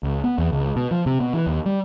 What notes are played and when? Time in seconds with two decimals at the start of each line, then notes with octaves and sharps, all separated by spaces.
0.03 C#2
0.24 B3
0.38 E2
0.52 C#2
0.76 B2
0.91 F3
1.06 C3
1.20 B2
1.34 E3
1.47 D#2
1.66 G3